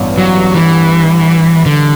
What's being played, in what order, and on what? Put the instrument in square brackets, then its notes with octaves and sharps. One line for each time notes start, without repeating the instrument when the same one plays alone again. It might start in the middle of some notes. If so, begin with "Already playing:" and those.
Already playing: [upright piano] A1 G2 B3
[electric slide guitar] F#3
E3
D3